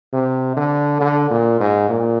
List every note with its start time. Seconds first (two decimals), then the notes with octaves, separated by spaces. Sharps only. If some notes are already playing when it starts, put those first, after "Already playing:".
0.13 C3
0.57 D3
1.01 D3
1.30 A#2
1.60 G#2
1.89 A#2